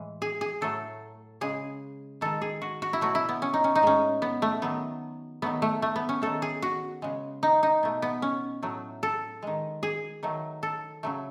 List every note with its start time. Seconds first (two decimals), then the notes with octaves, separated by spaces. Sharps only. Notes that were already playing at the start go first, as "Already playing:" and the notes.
Already playing: A2 E3 G#3
0.22 G#4
0.41 G#4
0.61 A2 F#3 A3 A4
1.41 C#3 G#3 G#4
2.21 D#3 G#3 A4
2.42 G#4
2.62 F#4
2.82 F#4
2.93 E4
3.01 B2 F#3 A3 F#4
3.15 E4
3.29 B3
3.42 C#4
3.54 D#4
3.64 C#4
3.75 D#4
3.82 A2 G#3 C#4
4.22 B3
4.42 A3
4.62 D#3 F#3 A3 B3
5.42 D#3 F#3 A3 B3
5.62 A3
5.82 A3
5.96 B3
6.09 C#4
6.22 D#3 A3 A4
6.42 G#4
6.62 F#4
7.02 C#3 G#3
7.43 D#4
7.63 D#4
7.83 B2 A3
8.02 B3
8.22 C#4
8.62 A2 F#3 A3
9.03 A4
9.43 D#3 G#3
9.83 G#4
10.23 D#3 F#3 A3
10.63 A4
11.03 C#3 F#3 A3